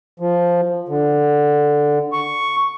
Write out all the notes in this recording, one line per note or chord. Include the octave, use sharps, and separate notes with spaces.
F3
D3
C#6